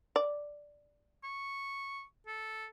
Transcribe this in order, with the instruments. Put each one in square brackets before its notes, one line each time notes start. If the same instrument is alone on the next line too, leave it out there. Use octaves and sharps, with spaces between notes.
[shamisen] D5
[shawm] C#6
A4